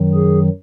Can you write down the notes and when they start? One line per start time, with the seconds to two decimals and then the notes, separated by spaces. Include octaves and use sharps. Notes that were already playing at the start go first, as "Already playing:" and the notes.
Already playing: F#2 D#3 F#3
0.14 G#4